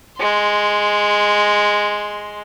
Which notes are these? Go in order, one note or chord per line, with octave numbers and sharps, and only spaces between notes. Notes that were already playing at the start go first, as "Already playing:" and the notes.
G#3 C6